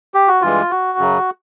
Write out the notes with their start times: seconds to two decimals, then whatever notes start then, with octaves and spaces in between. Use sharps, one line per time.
0.14 G4
0.28 F#4
0.42 G2 E3 G#3 F4
0.71 F#4
0.98 F#2 C#3 F#3